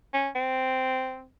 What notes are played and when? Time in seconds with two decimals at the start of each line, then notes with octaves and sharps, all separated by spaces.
0.14 C#4
0.35 C4